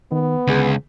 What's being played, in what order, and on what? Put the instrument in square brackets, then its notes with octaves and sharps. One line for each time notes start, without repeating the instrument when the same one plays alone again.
[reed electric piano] D#3 [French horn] B3
[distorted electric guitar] C#2 [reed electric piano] D3 G#4